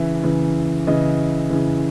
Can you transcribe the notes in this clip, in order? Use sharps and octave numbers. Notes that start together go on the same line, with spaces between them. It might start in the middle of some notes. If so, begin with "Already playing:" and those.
Already playing: C#3 E3 E5
C#3 E3
C#3 E3 D#5
C#3 E3